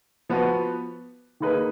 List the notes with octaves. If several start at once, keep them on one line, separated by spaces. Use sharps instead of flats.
F3 B3 F#4 B4
D#3 A#3 D#4 G#4 B4